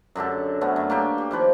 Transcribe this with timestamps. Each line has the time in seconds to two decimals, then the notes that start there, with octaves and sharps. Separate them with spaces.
0.15 F#2 D3 G4 A4
0.61 D3 A3 B3 C#4
0.76 F#2
0.90 A#3 D4 G4 C#5
1.18 G4
1.31 D#3 F3 B4 C#5